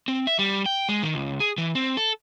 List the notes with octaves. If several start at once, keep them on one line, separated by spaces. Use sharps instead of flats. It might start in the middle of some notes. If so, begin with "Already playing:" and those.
C4
E5
G3
G5
G#3
D#3
C#2
G#4
E3
C4
A4